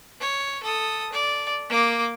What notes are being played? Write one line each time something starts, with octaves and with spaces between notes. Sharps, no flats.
C#5
A4 D#6
D5
A#3 D6